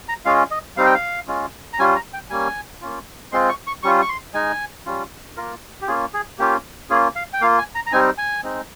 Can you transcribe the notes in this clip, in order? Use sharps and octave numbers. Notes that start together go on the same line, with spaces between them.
A#5
G#3 C#4 F4 F5
D#5
G3 C4 D#4 F5
G5
F5
G#3 C#4 F4
A#5
G3 C#4 F4 G#5
A#5
G5
G3 A#3 C#4 G#5
A#3 C#4 F4
G#3 C4 F4 C6
C#6
C#6
G3 C#4 F4 C#6
C#6
C6
G#3 D#4 G#5
G3 C#4 F4
A#3 F4 A#4
G4
A#3 C#4 F4 G#4
G#4
A#3 C#4 F4 G4
A#3 C#4 F4 G#4
F5
G5
A#3 F4 F5
G#5
A#5
A#5
G3 C4 D#4 G#5
G#5
G#3 C4 D#4